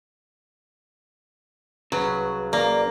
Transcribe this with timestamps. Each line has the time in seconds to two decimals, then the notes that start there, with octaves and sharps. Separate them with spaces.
1.92 C2 C#3 F#3 B4
2.53 A#3 D5